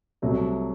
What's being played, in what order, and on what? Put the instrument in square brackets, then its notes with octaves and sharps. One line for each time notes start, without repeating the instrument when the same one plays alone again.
[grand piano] C2 C3 F#3 A3